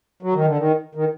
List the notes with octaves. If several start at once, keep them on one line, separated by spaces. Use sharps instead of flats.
F#3
D#3
D3
D#3
D#3